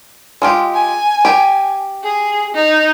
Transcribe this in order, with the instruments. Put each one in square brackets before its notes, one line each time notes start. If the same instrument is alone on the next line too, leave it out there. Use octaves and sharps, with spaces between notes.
[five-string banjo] G#3 F4 G4
[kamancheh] G#5
[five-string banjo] G4 G5
[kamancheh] G#4
D#4